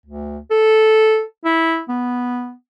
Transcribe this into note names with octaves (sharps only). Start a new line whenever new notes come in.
D2
A4
E4
B3